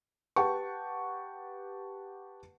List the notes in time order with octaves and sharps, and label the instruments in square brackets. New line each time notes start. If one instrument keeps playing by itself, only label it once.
[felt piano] G4 B4 F#5 G5 A5 C#6